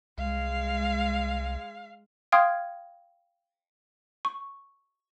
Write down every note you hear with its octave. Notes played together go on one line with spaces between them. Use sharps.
C2 G#3 F5
F5 G5 C6 D#6 F6 G#6
C#6